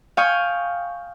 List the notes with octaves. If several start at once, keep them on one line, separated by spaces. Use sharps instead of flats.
F5 G5 G#5 C#6 D#6